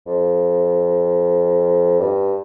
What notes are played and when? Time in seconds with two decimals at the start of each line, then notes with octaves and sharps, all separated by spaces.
0.07 F2
2.00 G2